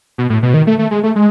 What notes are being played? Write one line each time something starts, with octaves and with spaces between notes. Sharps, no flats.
B2
A2
B2
D#3
A3
A3
G#3
A3
G#3